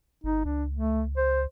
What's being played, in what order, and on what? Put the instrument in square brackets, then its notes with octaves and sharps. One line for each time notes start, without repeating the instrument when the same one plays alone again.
[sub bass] G1 [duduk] D#4
[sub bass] C#2 [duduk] D4
[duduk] A3
C5